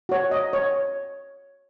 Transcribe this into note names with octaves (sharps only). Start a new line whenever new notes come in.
F#4 C#5
D#5
C#5